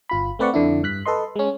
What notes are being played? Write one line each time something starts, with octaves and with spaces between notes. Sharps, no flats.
G1 F4 B5
A3 C4 B4 D5 F#5 C#6
F2 D3 D4 E4
G2 F#6 B6
A4 B4 D#5 C6
G#3 C#4